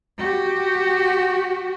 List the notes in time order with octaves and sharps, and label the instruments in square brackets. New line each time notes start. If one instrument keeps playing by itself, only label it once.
[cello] F#4 G4